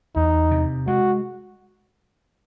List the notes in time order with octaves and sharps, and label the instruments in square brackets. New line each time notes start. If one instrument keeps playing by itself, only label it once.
[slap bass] E2 [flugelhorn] D#4
[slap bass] C3
[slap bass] G#3 [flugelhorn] F#4